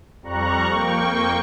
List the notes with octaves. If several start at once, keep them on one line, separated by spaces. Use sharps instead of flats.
F2 G3 A#5 C#6 F#6
F2 A#3 G5 C#6